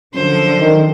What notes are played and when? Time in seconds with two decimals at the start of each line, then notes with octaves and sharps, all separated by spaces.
0.14 F#2 D3 F3 C5
0.59 D#3